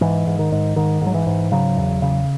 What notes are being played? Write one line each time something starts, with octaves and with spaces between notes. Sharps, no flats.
G#2 E3
G#2
D#3
G#2
G#2 D#3
G#2
F#3
E3
G#2
C#3 F#3
E2
C#3